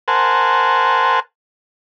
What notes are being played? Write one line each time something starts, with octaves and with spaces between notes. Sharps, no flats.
A#4 C5 F#5 G#5 A5